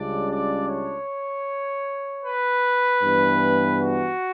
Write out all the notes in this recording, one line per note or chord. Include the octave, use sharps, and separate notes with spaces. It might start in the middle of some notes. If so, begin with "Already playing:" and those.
Already playing: C#2 C#3 G3 D4 D5
D5
C#5
B4
G2 E3 B3
F#4